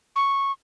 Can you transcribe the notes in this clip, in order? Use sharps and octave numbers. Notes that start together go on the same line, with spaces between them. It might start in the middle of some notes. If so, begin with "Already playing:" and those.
C#6